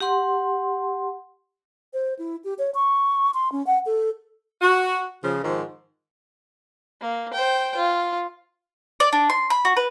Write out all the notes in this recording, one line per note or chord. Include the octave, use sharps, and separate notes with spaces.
G4 F#5 C6
C5
E4
G4
C#5
C#6
C6
C#4
F#5
A4
F#4
C#3 F3
G#2 D#3 F3
A#3
C5 G5
F4
D5
D4
C6
B5
F#4
B4